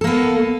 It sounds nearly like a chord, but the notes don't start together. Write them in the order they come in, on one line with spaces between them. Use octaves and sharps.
A4 A#3 B3